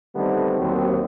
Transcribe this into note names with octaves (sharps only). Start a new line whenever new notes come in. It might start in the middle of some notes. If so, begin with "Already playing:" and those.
D3 D#3 G3 A3 B3 C4
D#2 F#3 C4